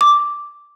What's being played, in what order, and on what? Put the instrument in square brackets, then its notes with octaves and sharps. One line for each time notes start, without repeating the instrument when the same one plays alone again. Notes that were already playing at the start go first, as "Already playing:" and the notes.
[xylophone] D6